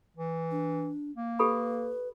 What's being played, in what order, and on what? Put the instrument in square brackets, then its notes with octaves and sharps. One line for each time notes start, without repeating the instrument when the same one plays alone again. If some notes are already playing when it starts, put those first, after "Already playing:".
[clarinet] E3
[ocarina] D4
[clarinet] A#3
[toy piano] G4 A4 B5 [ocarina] B4